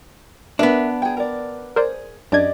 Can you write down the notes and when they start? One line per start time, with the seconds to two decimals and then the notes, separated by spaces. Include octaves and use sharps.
0.59 B3 D4 A#4 B4 E5
1.02 G#4 G5
1.17 A#4 D5
1.76 G#4 A#4 C5 D5
2.32 F#2 D4 G4 D5 D#5 G#6